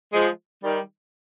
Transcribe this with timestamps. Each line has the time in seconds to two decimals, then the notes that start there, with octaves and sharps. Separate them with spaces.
0.13 F3 G#3
0.63 D#3 G3